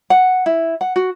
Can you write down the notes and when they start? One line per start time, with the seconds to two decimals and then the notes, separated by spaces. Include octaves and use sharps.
0.10 F#5
0.46 E4
0.81 F#5
0.96 F#4